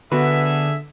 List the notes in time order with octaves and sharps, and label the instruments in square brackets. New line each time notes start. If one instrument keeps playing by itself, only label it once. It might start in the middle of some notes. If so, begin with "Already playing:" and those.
[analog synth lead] D3 [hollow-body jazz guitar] B3 F#4 B4 [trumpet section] G#4 A4 E5